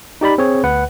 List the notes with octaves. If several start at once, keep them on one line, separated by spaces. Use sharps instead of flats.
D#4 G4 D5 B5
C4 G#4 C#5
D2 B4 F#5